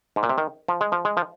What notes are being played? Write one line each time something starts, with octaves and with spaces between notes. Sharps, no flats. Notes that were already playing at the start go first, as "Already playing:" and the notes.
G#2
A#2
C3
D#3
F3
G#3
F3
G#3
F3